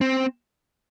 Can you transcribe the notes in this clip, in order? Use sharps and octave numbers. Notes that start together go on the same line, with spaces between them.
C4